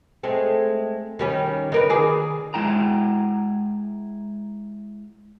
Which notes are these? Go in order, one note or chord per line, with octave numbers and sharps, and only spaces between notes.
G#3 A3 C4
D#3 G3 C#4
D#4 A#4 B4
D#3 G#4 D5
G#3 E4 G5 A#5